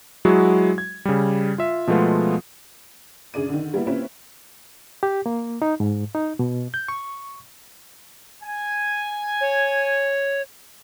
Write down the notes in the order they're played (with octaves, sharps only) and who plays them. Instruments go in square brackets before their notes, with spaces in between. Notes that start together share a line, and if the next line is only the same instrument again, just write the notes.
[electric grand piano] F#3 G#3 E4 F#4 G#4
G#6
C#3 G3
F4 E5
B2 F3 G#3 A3 B3 F4
[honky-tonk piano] F#2 C#3 D4 G#4 D5 D#7
D3 D#3
G3 A#3 B3 E4
A#3 C4 C#4 E4 F4 B4
[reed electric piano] G4
A#3
D#4
G#2
D#4
B2
G6
C#6
[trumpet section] G#5
[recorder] C#5